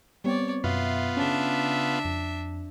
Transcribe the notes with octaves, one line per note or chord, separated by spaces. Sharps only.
G3 B3 C4 C#5 D5
F#2 B2 B3 F4 E5 C6
C#3 C#4 D4 E5
F2